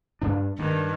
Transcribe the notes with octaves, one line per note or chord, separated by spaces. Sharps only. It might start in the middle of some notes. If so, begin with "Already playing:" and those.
G2 D4
G2 D#3